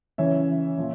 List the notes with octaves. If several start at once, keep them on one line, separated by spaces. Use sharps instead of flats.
C#3 E3 C#5 E5
A#2 F3